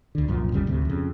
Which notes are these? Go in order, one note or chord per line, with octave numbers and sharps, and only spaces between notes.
D2 D3
C2 F#2 A#2 F3
G1 D#2 C#3 G3
D2 A2 C3
F2 C#3